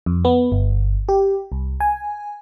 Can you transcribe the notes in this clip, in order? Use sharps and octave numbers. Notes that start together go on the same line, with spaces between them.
F2
B3
G1
G4
C2
G#5